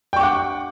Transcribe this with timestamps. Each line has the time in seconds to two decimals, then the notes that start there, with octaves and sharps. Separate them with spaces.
0.13 G5
0.16 C#6
0.20 D6
0.23 F#5